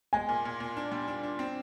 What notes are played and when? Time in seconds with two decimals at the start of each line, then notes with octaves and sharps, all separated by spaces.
0.13 G#3 G#5
0.29 A#2
0.45 A#2
0.60 A#2
0.77 D4
0.92 G3
1.08 D4
1.23 D4
1.39 C4